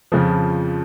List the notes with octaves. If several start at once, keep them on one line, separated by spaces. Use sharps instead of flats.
F2 C#3 F3